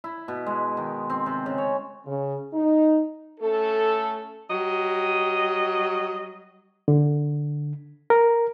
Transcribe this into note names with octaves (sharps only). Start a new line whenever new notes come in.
E4
B2
G#3
D#3
C4
C3
C#3
C#5
C#3
D#4
A3 C#4 A4
F#3 G3 D#5
D3
A#4